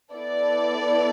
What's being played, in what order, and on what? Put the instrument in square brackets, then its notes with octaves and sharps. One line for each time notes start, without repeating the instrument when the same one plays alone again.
[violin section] B3 E4 A4 D5